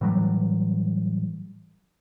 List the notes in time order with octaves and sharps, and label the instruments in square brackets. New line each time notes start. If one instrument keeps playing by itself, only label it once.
[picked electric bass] A2 E3 F#3 G3